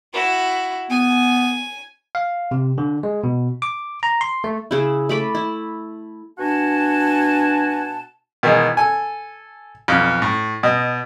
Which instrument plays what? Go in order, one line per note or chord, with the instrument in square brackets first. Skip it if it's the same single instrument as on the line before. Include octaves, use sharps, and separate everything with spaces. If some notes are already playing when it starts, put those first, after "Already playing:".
[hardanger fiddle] E4 F#4
[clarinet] B3 [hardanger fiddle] G#5
[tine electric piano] F5
C3
D3
G#3
B2
D6
A#5
C6
A3
[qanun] C#3 E4
A3 B5 D6
E4
[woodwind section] B2 D4 F#4 F#5 G#5 A5
[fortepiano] B2 D#3 E3 G#3
A4 G#5
B1 F2
A2
B2 D#5